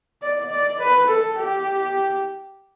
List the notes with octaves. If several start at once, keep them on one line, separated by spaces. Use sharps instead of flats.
D5
D5
B4
A4
G4